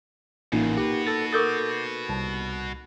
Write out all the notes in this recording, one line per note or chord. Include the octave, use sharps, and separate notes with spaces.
A1 E2 C#3 A#3 D#4 F4
F#4 G4 B4
A4 A6
A4 A#4 C#6 D6 G6 A6
C2 A5